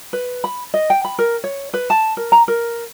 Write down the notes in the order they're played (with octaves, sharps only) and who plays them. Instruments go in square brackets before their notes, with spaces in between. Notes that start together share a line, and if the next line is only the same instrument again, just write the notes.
[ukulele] B4
B5
D#5
G5
B5
A#4
C#5
B4
A5
A#4
A#5
A#4